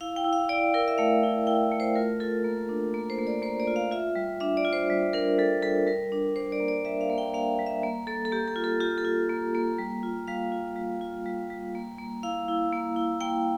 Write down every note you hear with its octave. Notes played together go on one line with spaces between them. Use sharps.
E4 F5
G5
E4
F5
E4 D5
E4 A#4
E5
A3 F5
E4
E4 G5
A3
C5
F4 A#4
F4 A4
A#3
D4
A#3
C5
A#3
D5
A#3 C5
D5
F4
F5
F4 E5
G3
D4 E5
D5
F4
C5
G3
D4 A#4
G3 A4
G3 A4
G3 A#4
D4
D4 C5
D5
A#3
D5
G3 E5
F5
A#3
G5
A#3 F5
G3
E5
A#3
A#3 A4
A4
A#3 G4
A4
F4
A4
F4 G4
A4
F4
A#3
A#3
G3
F4
G3 F5
F4
G3
F4
G3
G3
A#3
A#3
E4 F5
E4
A#3
E4
A#3 G5